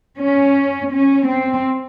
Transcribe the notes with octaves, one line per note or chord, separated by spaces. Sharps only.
C#4
C#4
C4